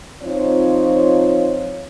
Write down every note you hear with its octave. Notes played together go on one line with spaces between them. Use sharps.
F3 C4 D#4 F4 C#5